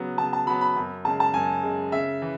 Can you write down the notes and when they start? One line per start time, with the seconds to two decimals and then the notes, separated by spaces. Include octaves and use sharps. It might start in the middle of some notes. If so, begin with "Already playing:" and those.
Already playing: C#3 F#3 B3
0.18 C#3 A5
0.33 A5
0.47 F#3 B3 B5
0.61 B5
0.76 F#2
1.05 C#3 G#3 A5
1.20 A5
1.34 F#2 G#5
1.63 C#3 G#3
1.92 C#3 E5
2.22 E3